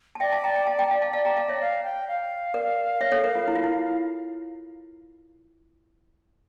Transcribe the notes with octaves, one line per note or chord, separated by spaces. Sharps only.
A5
D5 E5 G5
F5 A5
G5 A#5
G5 A#5
F5 A5
G5 A#5
F5 A5
F5 A5
D5 F5 A5
G5 A#5
F5 A5
C#5 E5
F5
G5
F5
A#4 D5
C#5 E5
A4 C#5
A#4
F4
E4
F4
E4